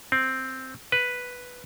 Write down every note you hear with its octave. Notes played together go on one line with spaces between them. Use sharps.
C4
B4